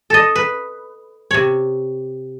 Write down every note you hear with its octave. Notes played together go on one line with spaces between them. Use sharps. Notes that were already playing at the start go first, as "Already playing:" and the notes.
A4 D#5
B4
C3 C#5